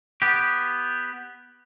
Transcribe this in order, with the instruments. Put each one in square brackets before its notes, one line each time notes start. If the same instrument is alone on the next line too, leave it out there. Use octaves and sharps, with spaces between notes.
[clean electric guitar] B3 G4